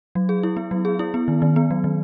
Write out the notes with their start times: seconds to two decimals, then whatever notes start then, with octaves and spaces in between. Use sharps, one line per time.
0.15 F#3
0.29 G#4
0.43 E4
0.57 B3
0.71 F#3
0.85 G#4
0.99 E4
1.14 B3
1.28 D#3
1.42 D#3
1.56 B3
1.71 F#3
1.84 D#3